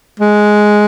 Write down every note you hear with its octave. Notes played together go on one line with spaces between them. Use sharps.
G#3